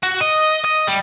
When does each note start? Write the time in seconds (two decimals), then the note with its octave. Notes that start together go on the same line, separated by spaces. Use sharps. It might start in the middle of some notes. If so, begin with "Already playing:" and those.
0.03 F#4
0.21 D#5
0.64 D#5
0.87 G3